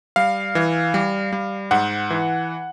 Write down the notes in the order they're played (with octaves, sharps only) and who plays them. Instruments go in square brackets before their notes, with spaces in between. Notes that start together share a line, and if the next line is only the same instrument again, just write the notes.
[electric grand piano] G3 F5
E3
G3
G3
G#2 F#5
E3